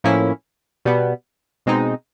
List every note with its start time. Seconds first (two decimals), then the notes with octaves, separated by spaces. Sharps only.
0.04 A2 F3 A#3 C#4 E4
0.85 B2 G3 B3
1.66 B2 G#3 C4 D#4